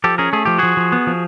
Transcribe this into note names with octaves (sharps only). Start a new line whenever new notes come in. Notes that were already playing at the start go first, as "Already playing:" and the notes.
F3 G4 A4
C#4 G#4 A#4
A3 G#4
F3 G4
F3 F#4 G#4
F3
B3
F3